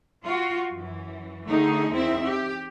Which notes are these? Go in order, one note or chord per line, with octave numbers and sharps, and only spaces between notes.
F4 F#4
F#2 E3
D3 D#3 A3 D#4 G#4
E2 D#3 C4 E4 E5
G4